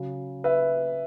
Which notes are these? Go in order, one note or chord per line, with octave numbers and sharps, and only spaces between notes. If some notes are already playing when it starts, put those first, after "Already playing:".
Already playing: C#3 F#3
B4 E5